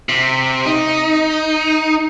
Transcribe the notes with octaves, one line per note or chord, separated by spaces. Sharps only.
C3
D#4